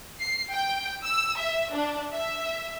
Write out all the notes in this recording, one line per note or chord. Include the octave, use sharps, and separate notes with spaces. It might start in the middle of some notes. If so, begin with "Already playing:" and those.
C7
G5
E6
E5
D4
E5